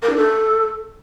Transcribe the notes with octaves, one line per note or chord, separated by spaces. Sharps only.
A#4
D4
A4